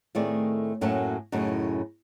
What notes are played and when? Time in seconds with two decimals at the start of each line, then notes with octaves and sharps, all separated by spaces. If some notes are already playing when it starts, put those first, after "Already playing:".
0.15 A2 D#3 A3 C4 G#4 D5
0.81 F#2 A2 F#3 A#3 C#4 A5
1.32 F#2 A2 C#3 D#4